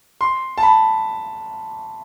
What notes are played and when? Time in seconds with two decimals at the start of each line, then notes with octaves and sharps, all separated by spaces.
0.21 C6
0.58 A5
0.63 B5